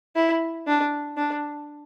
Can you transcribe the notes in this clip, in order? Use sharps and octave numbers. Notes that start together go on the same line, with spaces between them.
E4
D4
D4